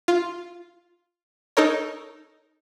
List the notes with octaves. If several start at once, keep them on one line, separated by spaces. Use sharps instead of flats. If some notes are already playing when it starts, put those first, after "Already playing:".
F4
D#4 A4 A#4 C#5